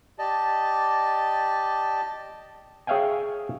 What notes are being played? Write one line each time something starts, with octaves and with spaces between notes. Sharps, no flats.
G4 D5 D#5 A5
G#4 C#5 E5 F5 G5 G#5